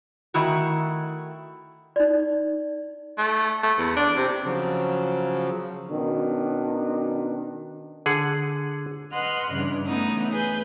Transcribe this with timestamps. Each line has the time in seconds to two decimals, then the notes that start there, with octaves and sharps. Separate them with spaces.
0.34 D#3 A3 E4 F#4
1.96 D#4 D5
3.18 A3
3.63 A3
3.78 E2
3.96 D4
4.16 C3
4.45 C#3 F3 F#3
5.90 B2 D#3 C#4 D4
8.06 D3 G#4 F#5
9.12 B4 D#5 F#5 C6 F6 F#6
9.50 G2 C#3 E3 D4
9.86 E3 A3 B3 C#4 D#4
10.32 G#4 B4 G6